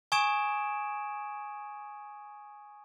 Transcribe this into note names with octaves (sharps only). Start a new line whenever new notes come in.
G#5 C#6 D#6 G#6 D7 E7